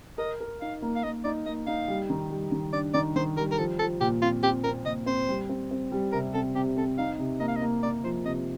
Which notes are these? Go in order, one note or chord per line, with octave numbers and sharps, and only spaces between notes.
A#4 D#5
A#4
D#4 F5
A#3
F5
A#3 D#5
D#4 D5
A#3 D#5
D#4 F5
G3
D#3
G3
D#3
D4 D5
D#3 D5
D#3 C5
G3 A#4
A#4
F3 A4
F3 A4
A#2 G4
C4 F4
C4 G4
C4 A#4
A#2 D#5
C4 C5
G3
C4
C4
G3
C3 A#4
C4 A4
C3 G4
C4 A4
D#4 F5
C3
A#3 D#5
F5
D#5
A#3
A#3 D5
F3 C5
C3 D#5